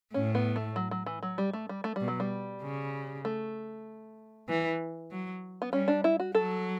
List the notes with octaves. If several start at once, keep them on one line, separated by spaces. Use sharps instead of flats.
A2 C#4
B3
A3
F#3
F#3
E3
F#3
G3
A3
G3
A3
B2 G3
F#3
G3
C#3
A3
E3
F#3
B3
G3 C#4
D4
E4
F#4
F#3 A4